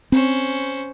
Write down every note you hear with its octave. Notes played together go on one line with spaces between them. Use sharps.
C4 C#4 C5